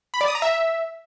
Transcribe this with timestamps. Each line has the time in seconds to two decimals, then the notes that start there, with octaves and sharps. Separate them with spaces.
0.14 B5
0.21 D5
0.28 D#6
0.35 A#5
0.42 E5